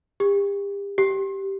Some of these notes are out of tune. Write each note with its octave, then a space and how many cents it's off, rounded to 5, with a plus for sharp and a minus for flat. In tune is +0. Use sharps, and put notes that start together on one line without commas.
G4 +40
G4 -5